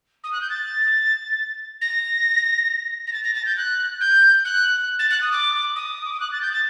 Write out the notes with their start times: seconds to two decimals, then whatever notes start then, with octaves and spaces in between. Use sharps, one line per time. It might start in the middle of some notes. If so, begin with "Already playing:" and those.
0.24 D#6
0.32 F#6
0.41 G6
0.50 A6
1.81 A#6
3.07 A#6
3.13 A6
3.24 A#6
3.35 A6
3.46 G6
3.57 F#6
4.01 G6
4.45 F#6
4.99 A6
5.10 F#6
5.21 D#6
5.32 D6
5.76 D#6
6.05 D6
6.12 D#6
6.20 F#6
6.32 A6
6.41 G6
6.52 A6